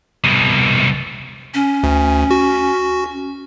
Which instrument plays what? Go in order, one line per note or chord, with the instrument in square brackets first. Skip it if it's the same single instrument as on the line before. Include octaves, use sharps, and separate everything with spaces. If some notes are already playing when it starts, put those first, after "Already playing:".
[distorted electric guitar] C2 B2
[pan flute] C#4
[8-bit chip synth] D2
F#4